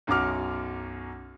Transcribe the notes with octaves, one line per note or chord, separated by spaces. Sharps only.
B1 F#2 F#4 D6 F6